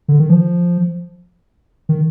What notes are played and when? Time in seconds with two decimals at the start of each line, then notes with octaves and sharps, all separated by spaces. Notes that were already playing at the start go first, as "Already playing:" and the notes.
0.08 D3
0.19 D#3
0.30 F3
1.89 D#3